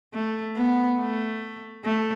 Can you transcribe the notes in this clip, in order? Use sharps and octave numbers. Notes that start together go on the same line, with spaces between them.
A3
B3
A3
A3